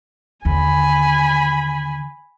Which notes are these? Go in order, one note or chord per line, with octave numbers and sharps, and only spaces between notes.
D#2 D3 G#5 B5